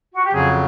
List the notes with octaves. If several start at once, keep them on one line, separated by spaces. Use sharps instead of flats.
F#4
G4
F2 C#3 F#3 G#4